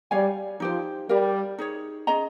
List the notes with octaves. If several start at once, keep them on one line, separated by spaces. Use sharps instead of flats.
G3 G4 C#5 F5 G#5
F3 D#4 G4 C5
G3 G4 A#4 F5
D#4 G#4 C#5
C#4 G#4 D#5 A#5